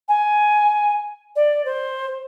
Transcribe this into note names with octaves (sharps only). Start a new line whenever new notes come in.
G#5
D5
C5